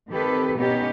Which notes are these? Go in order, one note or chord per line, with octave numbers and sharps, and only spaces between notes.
D#3 C4 G4 A4 B4
B2 B3 C#4 D#4 G4